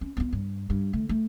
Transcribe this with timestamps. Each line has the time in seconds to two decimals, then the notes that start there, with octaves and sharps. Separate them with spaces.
0.01 C#4
0.17 B3 F4
0.33 G2
0.70 G2
0.93 D3 A3
1.09 A3